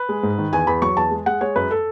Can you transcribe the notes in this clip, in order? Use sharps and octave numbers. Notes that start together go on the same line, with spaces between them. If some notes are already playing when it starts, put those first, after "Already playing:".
Already playing: B4
G#3
G#2
D#3
E2 G#5
E2 B5
F#3 C#6
E2 A5
G#3
G#3 F#5
G#3 C#5
F#2 B4
A4